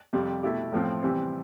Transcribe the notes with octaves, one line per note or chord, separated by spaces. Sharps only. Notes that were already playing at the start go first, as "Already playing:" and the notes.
F2 C3 G3
B2 A3 E4 G4
A1 A2 F3 C4
C3 E3 G3 C4